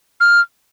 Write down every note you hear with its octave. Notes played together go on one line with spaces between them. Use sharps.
F6